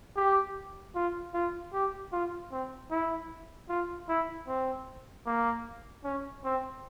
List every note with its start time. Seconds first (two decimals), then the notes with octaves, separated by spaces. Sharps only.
0.16 G4
0.95 F4
1.34 F4
1.73 G4
2.12 F4
2.52 C4
2.91 E4
3.69 F4
4.09 E4
4.48 C4
5.26 A#3
6.04 C#4
6.44 C4